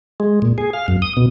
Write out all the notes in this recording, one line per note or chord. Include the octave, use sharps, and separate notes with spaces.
G#3
A#2
G#4
F5
F#2
D#6
B2